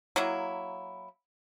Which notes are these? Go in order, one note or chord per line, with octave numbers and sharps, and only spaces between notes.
F#3 A#3 E4